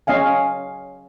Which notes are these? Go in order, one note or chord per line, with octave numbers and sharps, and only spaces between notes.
C#4 D#5 F5 G#5